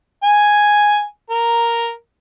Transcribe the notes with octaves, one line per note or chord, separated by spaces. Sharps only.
G#5
A#4